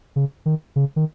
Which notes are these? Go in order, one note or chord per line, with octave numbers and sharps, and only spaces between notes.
C#3
D#3
C#3
D#3